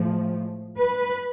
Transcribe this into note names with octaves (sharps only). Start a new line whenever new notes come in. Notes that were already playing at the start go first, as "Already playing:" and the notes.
Already playing: A2 F3 G#3
B4